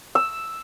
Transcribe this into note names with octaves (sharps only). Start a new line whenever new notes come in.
E6